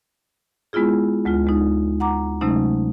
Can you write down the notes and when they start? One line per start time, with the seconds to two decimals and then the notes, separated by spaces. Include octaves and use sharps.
0.73 G#3 B3 E4 F4 G#4
1.25 D2 G#3 F4
1.47 G#3 D#4
2.00 F#5 A#5 D6
2.41 C3 F#3 G#3 A3 C#4 D#4